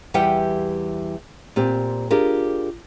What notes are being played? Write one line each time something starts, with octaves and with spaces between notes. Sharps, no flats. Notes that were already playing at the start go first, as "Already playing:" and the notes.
E2 E3 G3 G4 F#5 G5
A#2 C4 G4
D4 F4 G4 G#4 A#4